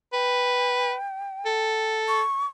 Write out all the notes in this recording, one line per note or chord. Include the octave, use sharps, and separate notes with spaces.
B4 G5
A4
C#6